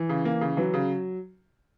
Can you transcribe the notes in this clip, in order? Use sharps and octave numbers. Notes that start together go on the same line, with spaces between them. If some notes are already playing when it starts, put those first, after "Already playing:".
Already playing: E3
C#3
A#3
C#3
E3 F#3
C#3